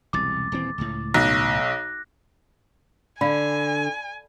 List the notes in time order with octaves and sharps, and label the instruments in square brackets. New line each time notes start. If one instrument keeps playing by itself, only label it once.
[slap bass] E1 C2 [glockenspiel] D6 A6
[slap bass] D#1 E3 C4
C#2 A2
[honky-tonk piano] B1 [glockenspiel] F#6 A#6
[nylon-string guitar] D3 [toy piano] D5 F5 B5 [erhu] G#5